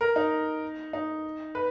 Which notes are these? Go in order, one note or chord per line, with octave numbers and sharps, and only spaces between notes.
A#4
D#4
D#4
B4